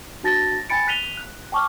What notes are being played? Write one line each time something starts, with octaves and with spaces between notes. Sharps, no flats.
D4 F#4 A5 A6 A#6
G5 G#5 B5 A6 C#7 D7
F#6 B6 D#7 F7 G7
F#6
G5 A5 C#6 D6 F6